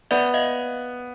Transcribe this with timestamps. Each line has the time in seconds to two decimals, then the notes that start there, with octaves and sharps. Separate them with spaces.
0.11 B3 D5 E5
0.34 D#5 F5